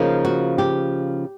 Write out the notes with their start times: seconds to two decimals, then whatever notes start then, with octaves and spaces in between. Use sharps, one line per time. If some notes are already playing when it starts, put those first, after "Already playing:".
Already playing: C#3 F3 A#3 D#4
0.25 F#4
0.58 G4